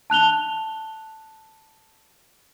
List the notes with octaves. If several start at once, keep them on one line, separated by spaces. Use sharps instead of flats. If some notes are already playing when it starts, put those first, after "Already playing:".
A5 F#6 F7 G7